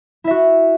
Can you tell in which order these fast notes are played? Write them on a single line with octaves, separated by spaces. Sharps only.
E4 E5 F#4